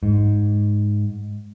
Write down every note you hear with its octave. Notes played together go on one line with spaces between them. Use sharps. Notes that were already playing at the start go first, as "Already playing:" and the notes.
G#2